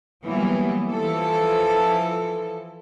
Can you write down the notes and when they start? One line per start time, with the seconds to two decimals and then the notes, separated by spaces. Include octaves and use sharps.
0.24 E3 F#3 G3 A#3 B3
0.89 E3 F3 A4